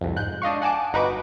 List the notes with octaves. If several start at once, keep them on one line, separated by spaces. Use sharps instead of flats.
C2 F2
G#2 F#6 G6
D4 D#5 F5 C#6
F#5 G#5 A5 D6
G1 D#4 F#4 B4 D6